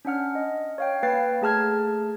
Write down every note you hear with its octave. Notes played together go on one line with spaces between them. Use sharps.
C#4 D4 F#5 F6
D#5
C#5 F5 G5
A#3 B4 G5 A6 C7
A3 G#4 A5 F6 G#6